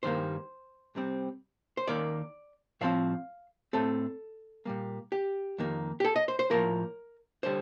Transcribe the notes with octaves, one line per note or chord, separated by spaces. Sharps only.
G2 D#3 G3 A#3 C5
C2 C3 G3 C4
C5
D#2 D#3 A#3 D5
A2 F3 C4 F5
A2 A3 C4 A4
A#2 G3 A#3
G4
F2 D#3 A#3
G4
A4
D#5
C5
C5
A2 F3 A#3 A#4
D3 G3 C5